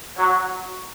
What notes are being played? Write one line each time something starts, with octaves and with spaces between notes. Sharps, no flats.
F#3